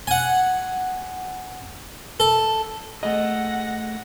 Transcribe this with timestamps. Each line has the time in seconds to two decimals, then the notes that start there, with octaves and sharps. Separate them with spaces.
0.07 F#5 G#5
2.20 A4
3.03 A3 G#4 D#5 F#5 A#6